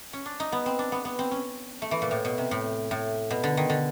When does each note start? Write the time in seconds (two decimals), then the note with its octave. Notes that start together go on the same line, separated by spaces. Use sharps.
0.13 C#4
0.26 D4
0.40 D#4
0.52 B3
0.66 C4
0.79 D4
0.92 B3
1.05 B3
1.19 C4
1.31 C#4
1.82 A3
1.91 E3
2.02 A#2
2.11 A2
2.25 B2
2.38 C3
2.51 A2
2.91 A2
3.30 B2
3.44 D3
3.57 D#3
3.70 D3